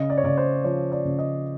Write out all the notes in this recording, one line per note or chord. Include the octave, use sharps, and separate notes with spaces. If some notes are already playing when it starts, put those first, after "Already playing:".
Already playing: C#3 D#5
D5
C#5
C#3 D5
C5
F3 C#5
D5
C#3
D#5